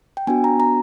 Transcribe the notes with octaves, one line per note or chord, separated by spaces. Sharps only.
G5
B3 D4 F#4 G#5
A#5
A#5